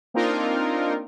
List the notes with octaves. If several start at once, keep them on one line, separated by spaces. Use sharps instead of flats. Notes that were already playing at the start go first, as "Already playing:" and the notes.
A#3 C4 D4 D#4 F4 A#4